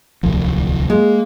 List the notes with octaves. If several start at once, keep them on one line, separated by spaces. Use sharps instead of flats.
D1 C2 F3
G#3 A#3